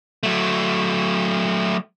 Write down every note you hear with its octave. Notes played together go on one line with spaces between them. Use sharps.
F#3 A3